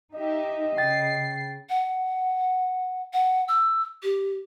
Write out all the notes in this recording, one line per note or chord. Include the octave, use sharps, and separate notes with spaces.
D#4 G4 D#5 E5
C#3 G5 A6 C7
F#5
F#5
E6
G4